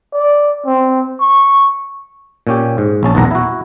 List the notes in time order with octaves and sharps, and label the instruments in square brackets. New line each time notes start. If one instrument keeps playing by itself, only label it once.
[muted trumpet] D5
C4
C#6
[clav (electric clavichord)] A#2 C#4 G4
G#2
A#1 C#4 A5
B1 E2 A#2 F#5 A#5
E4 F#4